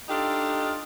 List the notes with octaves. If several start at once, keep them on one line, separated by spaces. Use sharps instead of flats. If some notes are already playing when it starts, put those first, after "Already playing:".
D4 D#4 F4 G4 A4